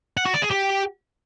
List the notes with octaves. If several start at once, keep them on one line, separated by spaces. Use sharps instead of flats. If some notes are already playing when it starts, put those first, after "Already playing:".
F#5
F#4
D5
G#4
G4